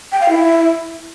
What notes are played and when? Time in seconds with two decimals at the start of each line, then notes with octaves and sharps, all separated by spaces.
0.12 G5
0.21 F5
0.29 E4